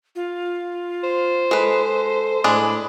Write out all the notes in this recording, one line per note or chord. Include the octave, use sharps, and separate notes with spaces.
F4
C5
G#3 A4 B4
A2 G#3 D4 G#4 B5